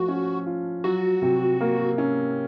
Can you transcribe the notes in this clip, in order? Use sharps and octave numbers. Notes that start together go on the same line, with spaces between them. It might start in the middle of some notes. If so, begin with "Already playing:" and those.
Already playing: F3 A3 F#4
C#4
F4
F#3 F#4
C3
A#3
C#4